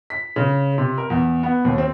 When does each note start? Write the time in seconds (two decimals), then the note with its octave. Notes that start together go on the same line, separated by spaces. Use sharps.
0.10 B6
0.36 C#3
0.78 C3
0.98 A#4
1.10 E2
1.43 B3
1.65 D#2
1.78 C4